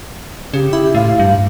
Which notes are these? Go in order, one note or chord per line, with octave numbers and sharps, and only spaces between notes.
C#3 G4
E4
A2 F5
G2